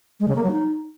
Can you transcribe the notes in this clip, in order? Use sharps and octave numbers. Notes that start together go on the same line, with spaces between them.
G#3
C#3
A#3
F#3
D#4